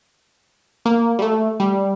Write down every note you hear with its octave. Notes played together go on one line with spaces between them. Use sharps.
A#3
G3
A3
G3